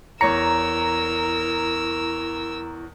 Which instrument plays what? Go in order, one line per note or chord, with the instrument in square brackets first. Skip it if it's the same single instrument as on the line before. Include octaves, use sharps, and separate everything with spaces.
[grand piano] E2 C#5 C#7 [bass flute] E4 [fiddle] A#4 E6 [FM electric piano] A#5